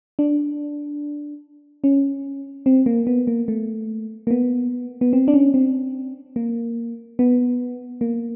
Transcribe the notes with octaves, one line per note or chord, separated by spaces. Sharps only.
D4
C#4
C4
A#3
B3
A#3
A3
A#3
B3
B3
C4
D4
C#4
C4
A#3
B3
A#3